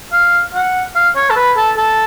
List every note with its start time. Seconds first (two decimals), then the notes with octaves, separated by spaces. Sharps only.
0.13 F5
0.54 F#5
0.95 F5
1.16 C#5
1.30 A4
1.36 B4
1.57 A4
1.77 A4